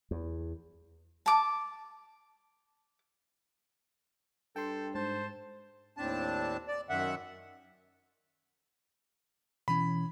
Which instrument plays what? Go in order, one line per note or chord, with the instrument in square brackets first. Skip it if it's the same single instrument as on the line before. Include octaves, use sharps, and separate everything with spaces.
[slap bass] E2
[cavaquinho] A5 D6
[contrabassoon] G2 [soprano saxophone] A4 [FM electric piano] G5 C6
[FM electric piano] G#2 [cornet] C5 [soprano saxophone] A5
[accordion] D#2 A2 C4 D4 A5
D5
F#2 D#3 E5 F#5
[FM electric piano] B2 E3 C#4 [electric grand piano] B5